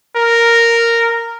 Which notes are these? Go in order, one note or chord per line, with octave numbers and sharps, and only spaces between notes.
A#4